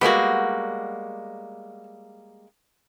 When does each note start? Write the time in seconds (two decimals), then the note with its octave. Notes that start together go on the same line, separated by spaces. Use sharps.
0.01 G3 G#3 A#3 B3 F#4